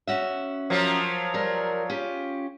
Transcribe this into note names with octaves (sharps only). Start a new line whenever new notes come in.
C#4 F#4 E5
F3 F#3 A#3
G3 A#4
C#4 F4 G4